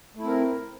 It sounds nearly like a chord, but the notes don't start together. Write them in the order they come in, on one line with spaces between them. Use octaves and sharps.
A3 E4 C4 A#4